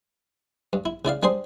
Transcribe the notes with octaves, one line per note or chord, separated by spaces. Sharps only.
G2
E4
C#3 E4 D5 F5
G3 D4 G#4 C5 C6